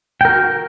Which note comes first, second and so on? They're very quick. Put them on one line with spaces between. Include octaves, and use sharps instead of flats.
G5 A#4 F#4